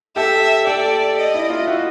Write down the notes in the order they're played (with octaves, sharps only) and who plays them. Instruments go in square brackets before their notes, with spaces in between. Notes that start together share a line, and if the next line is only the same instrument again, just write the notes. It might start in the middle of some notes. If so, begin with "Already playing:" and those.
[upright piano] G4 A4 [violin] E5
[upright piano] G4 A4 [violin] D5
[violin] D#5
[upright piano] E4
F4
E4 F#4